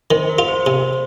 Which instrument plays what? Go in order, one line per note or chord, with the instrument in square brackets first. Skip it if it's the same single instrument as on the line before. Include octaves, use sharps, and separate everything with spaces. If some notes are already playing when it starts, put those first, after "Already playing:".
[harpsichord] D#3 [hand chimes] C5
[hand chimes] A#4
[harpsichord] F4
[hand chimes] C5
[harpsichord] C3